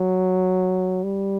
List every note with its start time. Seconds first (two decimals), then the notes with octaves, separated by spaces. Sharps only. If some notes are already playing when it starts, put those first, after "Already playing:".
Already playing: F#3
1.03 G3